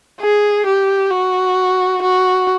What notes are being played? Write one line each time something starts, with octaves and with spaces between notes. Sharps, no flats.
G#4
G4
F#4
F#4